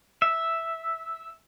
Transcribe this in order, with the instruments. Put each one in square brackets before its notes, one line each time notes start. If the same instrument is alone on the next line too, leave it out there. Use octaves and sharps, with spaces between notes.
[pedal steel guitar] E5